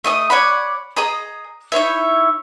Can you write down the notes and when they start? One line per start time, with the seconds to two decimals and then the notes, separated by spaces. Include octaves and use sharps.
0.04 A3 D#5 E5 D#6
0.30 C#5 D5 F#5 B5
0.97 G#4 D#5 A#5 D#6
1.72 D#4 E4 C#5 E5